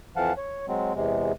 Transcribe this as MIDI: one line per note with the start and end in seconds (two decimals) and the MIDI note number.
0.16 0.33 41
0.16 0.33 52
0.16 0.33 53
0.16 0.33 77
0.16 0.33 78
0.16 0.33 81
0.37 0.66 73
0.68 0.93 54
0.68 0.93 56
0.68 0.93 60
0.95 1.32 40
0.95 1.32 48
0.95 1.32 56